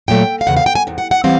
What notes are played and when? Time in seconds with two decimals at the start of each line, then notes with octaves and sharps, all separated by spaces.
0.08 A#2 F#3 A3 G5
0.41 F5
0.47 E2 C#3 F#5
0.57 F5
0.66 G5
0.75 G#5
0.87 E2 C3
0.98 F#5
1.11 F#5
1.24 E3 G3 C4 F5